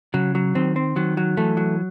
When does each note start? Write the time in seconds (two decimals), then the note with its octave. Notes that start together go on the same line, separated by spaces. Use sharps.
0.14 C#3 F#3
0.35 F#3
0.55 D#3 C4
0.76 C4
0.96 D#3 F#3
1.17 F#3
1.37 E3 A3
1.57 F#3